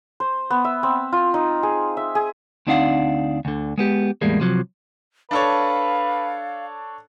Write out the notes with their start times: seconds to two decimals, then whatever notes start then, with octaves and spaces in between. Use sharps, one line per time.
0.20 C5
0.50 B3
0.65 E5
0.83 C4
1.12 F4
1.34 D#4
1.63 G#4
1.97 E5
2.15 G#4
2.67 D2 C4 D4 D#4 F5 F#5
3.45 D2 D3
3.78 G#3 B3 G4
4.21 E2 A2 G3 G#3 A#3
4.40 C3 F3 F#3
5.31 D4 A4 B4 C#5 F5